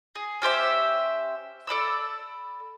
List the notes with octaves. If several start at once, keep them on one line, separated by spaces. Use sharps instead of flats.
G#4
C#4 G4 C5 E5
A4 D5 B5 E6